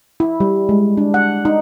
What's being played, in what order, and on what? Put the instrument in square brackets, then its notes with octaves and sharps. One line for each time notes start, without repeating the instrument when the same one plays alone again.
[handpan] E4
G3
G#3
D4
F#5
D#4